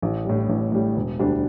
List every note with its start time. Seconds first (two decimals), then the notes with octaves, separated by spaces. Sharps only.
0.02 A1
0.25 A2 G3
0.49 A1
0.72 A2 G3
0.96 E1
1.19 D2 D3 G3 D4